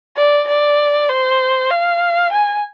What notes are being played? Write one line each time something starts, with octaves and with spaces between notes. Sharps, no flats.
D5
D5
C5
F5
G#5